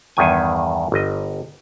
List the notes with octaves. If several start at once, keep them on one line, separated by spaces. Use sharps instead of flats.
E2 G2 D#3 G#5
G1 D#5